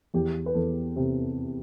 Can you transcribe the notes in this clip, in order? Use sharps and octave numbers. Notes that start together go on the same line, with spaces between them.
E2 G4
B4
E2 A4
C3 G4